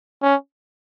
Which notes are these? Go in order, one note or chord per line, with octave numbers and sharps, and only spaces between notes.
C#4